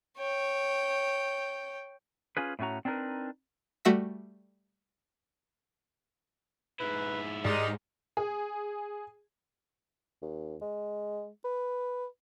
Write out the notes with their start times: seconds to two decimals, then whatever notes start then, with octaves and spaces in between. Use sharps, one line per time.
0.18 C#5 G5
2.37 C#4 F4 G#4 B4
2.59 A2 A3 C#4 F#4 A#5
2.85 C4 D4 D#4 G4 A#4 B4
3.85 G3 A3 F#4 E5 B6
6.80 G#2 E4 B4
7.45 G#2 D#3 G3 G#3 D#4 D5
8.17 G#4
10.22 D#2
10.62 G#3
11.44 B4